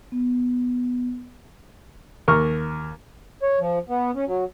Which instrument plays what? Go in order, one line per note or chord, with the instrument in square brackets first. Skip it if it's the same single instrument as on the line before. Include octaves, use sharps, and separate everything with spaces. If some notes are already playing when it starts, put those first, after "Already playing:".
[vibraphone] B3
[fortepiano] D#2 A#4 C#6 F6
[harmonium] C#5
F3
B3
C#4
F#3